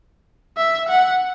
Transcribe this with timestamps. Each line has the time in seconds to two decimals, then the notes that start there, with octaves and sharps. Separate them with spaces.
0.57 E5
0.88 F#5